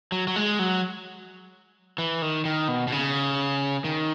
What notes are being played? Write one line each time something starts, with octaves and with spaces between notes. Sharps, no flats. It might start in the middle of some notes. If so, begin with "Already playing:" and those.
F#3
F#3
G#3
F#3
E3
D#3
D#3
B2
B2
C#3
D#3